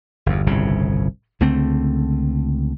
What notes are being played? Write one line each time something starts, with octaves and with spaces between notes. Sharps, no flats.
G1 E2
G1 C2 A2 C#3
C#2 D3 A3 C4